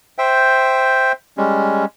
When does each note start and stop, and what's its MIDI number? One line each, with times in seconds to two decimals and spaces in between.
0.18 1.12 72
0.18 1.12 76
0.18 1.12 79
1.38 1.85 55
1.38 1.85 56
1.38 1.85 61